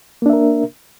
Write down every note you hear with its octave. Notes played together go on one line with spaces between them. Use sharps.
A#3 D4 A#4 E5